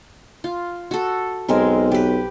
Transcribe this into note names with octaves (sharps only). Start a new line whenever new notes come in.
F4
F#4 A4
B1 G#3 C4 A#4
G4 B4